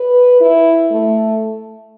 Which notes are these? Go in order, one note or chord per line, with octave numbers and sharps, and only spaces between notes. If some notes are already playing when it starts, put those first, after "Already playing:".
Already playing: B4
E4
A3